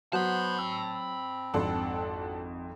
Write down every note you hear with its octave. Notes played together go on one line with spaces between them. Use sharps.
F#3 B3 F#4 C5 A5 B5 F#6
C4 E6
G#1 F2 D4 F#4 A4 C6